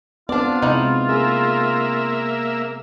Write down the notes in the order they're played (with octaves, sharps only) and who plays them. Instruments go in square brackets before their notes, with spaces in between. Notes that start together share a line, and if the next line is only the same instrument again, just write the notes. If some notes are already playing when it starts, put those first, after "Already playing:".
[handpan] B3 C4 [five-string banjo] D4 D5 [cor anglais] F4
[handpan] C3 G#3 [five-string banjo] D#4 E4
[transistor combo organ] A#3 E5 [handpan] G#4